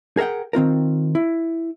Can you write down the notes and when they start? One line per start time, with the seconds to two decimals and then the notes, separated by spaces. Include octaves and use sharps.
0.17 G#4 A#4 E5 F#5 G5
0.53 D#3 C4 F4 A#4
1.15 E4